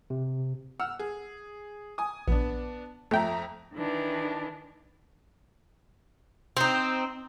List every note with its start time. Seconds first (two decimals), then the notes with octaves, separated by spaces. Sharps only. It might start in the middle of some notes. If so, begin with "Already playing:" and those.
0.10 C3
0.80 F#5 E6 F6
0.99 G#4
1.98 G#5 D#6
2.28 A#1 B3 D4
3.11 F2 A3 E5 G5 A#5
3.74 D#3 E3 D4
6.57 C4 D#4